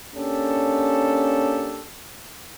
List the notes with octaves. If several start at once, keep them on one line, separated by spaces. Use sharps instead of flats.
A#3 C#4 D4 G4 A4